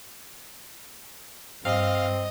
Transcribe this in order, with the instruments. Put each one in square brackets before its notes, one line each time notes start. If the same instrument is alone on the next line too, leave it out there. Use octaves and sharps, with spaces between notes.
[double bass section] G2 [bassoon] C4 [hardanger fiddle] D#5 [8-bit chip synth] F5